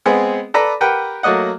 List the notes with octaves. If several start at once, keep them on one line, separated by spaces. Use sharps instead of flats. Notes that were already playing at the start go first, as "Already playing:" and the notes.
G#3 B3 C4 G#4
A4 B4 D5 A#5 B5
G4 A#4 B4 F#5 G5
F#3 A3 A#3 D#5 F#5